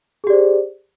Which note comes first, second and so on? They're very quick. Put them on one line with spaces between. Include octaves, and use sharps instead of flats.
G#4 G4 D5 C5